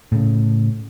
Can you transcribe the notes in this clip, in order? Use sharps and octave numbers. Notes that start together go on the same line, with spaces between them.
A2 C#3